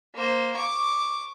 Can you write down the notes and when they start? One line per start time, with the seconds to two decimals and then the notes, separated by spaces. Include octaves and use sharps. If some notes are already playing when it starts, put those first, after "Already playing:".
0.14 A#3 C5
0.55 C#6 D6